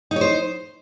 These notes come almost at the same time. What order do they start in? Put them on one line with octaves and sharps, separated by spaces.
D#4 C#5 C5